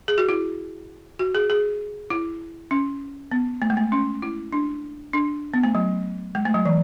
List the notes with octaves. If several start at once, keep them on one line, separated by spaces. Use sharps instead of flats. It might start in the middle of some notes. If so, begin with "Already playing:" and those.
G#4
F#4
E4
F#4
G#4
G#4
E4
C#4
B3
A3
G#3
A3
C#4
E4
D4
D4
B3
A3
F#3
G#3
A3
F#3
E3